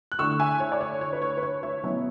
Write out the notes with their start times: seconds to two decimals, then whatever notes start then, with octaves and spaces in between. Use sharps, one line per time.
0.12 F#6
0.19 D3 A3 E4 C#6 E6
0.40 E5 G#5
0.60 C#5
0.72 D5
0.81 C#5
1.01 C#5
1.13 B4
1.22 C#5
1.38 B4
1.43 C#5
1.63 C#5 E5
1.83 B2 F#3 C#4 E4